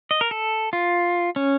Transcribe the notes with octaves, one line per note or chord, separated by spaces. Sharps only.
D#5
A#4
A4
F4
C#4